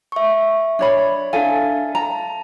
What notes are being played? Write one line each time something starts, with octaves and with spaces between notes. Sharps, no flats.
E5 C#6
D4 C#5 B5
D4 A4 E5 F5 G#5
A5 A#5